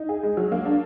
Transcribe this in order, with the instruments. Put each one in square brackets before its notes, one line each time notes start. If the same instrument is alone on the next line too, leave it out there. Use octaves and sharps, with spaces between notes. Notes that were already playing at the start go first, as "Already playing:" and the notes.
Already playing: [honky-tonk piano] D#4
G#4
G#3
F#3
A#3
D4